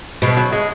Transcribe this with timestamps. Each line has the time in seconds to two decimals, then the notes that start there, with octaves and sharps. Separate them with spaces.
0.22 B2 G#3
0.37 F#3
0.53 G#3